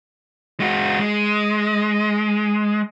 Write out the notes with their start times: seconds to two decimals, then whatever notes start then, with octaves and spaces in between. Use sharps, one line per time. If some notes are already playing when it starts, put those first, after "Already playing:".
0.60 G#3 F#4
0.99 G#3